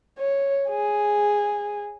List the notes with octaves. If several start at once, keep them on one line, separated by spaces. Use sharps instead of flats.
C#5
G#4